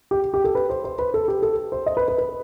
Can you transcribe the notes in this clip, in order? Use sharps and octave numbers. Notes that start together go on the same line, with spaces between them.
G4
G4
A4
B4
C5
C5
B4
A4
G4
A4
C5
D#5
B4
B4
B4